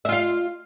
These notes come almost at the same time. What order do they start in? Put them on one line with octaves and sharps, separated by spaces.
E5 F4 F5